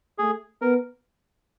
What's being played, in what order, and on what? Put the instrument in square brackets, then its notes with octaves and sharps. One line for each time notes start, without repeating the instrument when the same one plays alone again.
[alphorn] A3 [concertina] G#4
[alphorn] B3 [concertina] A#4